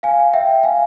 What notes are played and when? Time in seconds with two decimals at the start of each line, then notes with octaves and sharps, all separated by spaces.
0.03 F5 G#5
0.33 E5 G5
0.63 F5 G#5